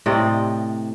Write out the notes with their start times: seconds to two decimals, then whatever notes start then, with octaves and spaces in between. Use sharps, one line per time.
0.06 A2 C3 D5 D#5